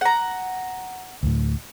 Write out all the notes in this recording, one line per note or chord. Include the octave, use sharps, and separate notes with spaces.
F#5 A#5
D2 A2